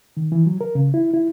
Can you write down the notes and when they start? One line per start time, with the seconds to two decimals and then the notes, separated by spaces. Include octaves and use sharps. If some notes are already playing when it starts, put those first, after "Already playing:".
0.17 D#3
0.32 E3
0.47 F#3
0.61 A#4
0.75 C#3
0.94 E4
1.14 E4